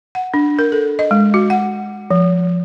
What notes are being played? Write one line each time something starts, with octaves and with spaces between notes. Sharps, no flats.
F#5
D4
A#4
A4
D#5
G#3
F#4
F#5
F3